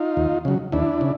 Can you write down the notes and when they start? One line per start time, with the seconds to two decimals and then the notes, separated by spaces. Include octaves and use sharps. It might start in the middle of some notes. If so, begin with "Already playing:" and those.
Already playing: D#4 F4
0.17 D#2
0.45 C#3 F#3
0.72 D#2 D4 E4
1.01 C#3